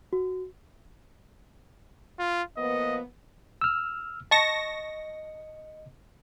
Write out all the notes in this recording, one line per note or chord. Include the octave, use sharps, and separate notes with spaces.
F#4
F4
F3 A#3 B3 D#5
E6 F6
D#5 A5 C#6 A#6 C#7